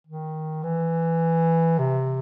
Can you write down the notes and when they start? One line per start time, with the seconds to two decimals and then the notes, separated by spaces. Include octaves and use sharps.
0.07 D#3
0.63 E3
1.79 C3